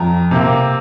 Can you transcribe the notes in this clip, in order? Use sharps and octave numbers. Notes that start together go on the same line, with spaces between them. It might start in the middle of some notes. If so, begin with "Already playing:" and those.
Already playing: F2 A#5
C3 A#3